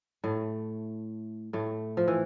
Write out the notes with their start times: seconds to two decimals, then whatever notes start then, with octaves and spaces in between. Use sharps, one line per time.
0.24 A2 A3
1.53 A2 A3
1.97 F3
2.08 E3